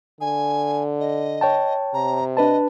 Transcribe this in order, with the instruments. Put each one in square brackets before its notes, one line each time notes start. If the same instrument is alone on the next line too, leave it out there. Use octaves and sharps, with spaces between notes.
[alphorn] D3 [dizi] G#5
[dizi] D#5
[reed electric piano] C#5 G5 A5
[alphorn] C3 [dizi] A#5
[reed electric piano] D4 B4 A5 [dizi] D#5